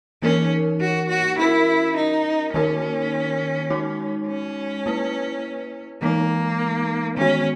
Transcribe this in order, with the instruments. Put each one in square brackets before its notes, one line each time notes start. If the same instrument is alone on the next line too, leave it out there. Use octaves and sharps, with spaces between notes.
[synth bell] E3 A#3 D#4 A#4 C#5 [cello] C#4
[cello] F#4
F#4
[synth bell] C#4 F#4 A#4 [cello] E4
[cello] D#4
[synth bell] D#3 A#3 D#4 F#4 A#4 [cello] C#4
[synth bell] G#3 D#4 F#4 C#5
[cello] C#4
[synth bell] A#3 E4 B4
[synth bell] E3 G#3 D#4 [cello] A#3
[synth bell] D#3 G#3 B3 F#4 [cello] C#4